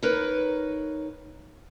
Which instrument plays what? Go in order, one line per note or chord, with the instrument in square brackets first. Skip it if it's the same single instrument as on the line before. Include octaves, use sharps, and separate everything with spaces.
[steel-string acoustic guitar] D#4 A#4 B4 C#5